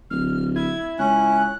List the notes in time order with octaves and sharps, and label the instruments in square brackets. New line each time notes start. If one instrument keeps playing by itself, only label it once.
[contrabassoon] D1 [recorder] F6
[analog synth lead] E4 [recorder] G#6
[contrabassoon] C#2 [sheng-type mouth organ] C#4 [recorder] F#6